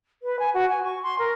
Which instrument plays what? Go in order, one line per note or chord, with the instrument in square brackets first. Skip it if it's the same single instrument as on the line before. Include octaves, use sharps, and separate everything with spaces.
[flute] B4
G#5
F#4
G#5
C#6
C6
A#4